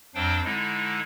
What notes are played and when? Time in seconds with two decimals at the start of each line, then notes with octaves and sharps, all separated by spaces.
0.15 F2 F#3 D4 C5 F5 G5
0.45 D3 G#3 D#4 E4 A4